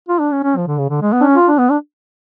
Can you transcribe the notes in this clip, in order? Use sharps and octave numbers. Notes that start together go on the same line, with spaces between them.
F4
D4
C#4
C#4
F3
D3
C#3
D3
G#3
B3
D4
C#4
F4
D4
B3
D4